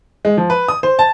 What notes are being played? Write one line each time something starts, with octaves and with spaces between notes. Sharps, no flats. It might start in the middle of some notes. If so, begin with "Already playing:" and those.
G#3
F3
B4
D#6
C5
A5